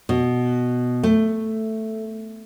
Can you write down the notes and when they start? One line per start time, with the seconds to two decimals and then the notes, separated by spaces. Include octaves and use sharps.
0.09 B2
1.03 A3